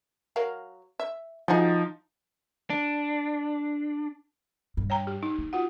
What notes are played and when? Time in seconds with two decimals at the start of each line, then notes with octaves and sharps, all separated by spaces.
0.36 F#3 A#4 F5
1.00 E5
1.48 F3 D#4 F#4 G#4 F#5
2.70 D4
4.77 G2
4.90 C#5 G5 A#5
5.07 G4
5.23 D#4
5.39 A#3
5.53 F4 F#4 F#5